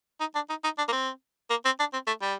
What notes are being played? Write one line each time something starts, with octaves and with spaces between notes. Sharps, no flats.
D#4
D4
D#4
D#4
D4
A#3
C4
A#3
C4
D4
C4
A3
G3